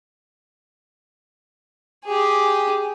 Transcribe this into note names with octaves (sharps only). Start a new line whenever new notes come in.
G4 G#4